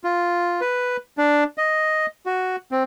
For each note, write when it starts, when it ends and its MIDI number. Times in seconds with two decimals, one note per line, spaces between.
0.04 0.61 65
0.61 0.97 71
1.18 1.44 62
1.58 2.06 75
2.26 2.56 66
2.71 2.83 60